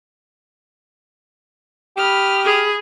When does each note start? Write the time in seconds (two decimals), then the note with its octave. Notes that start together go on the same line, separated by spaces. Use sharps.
1.97 G4 B5 D#6 F6
2.45 G#4